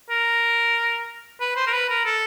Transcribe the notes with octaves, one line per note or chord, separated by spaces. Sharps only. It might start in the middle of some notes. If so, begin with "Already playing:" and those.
A#4
B4
C5
A#4
B4
A#4
A4